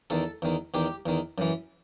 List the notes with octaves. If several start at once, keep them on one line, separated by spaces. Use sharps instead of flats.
E2 D#3 A4
E2 D#3
E2 D#3 G4
E2 D#3
F#2 E3